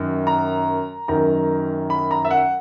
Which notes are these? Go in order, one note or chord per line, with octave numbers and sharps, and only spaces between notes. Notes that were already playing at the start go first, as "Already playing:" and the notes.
Already playing: F#2 D#3
A#5
F#2 D#3 A#5
B5
A#5
E5
F#5